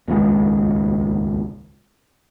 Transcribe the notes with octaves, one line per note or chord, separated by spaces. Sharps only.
D#1 G#1 C#2 G#3